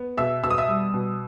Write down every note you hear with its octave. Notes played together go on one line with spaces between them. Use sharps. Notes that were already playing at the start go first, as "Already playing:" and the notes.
Already playing: B3
B2 E5 E6
B2 E6
D#6
E5 E6
G3
B2